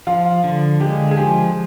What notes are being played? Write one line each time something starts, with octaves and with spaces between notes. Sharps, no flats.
F3 F4
D3
G#3 G4
G#4
F3 G4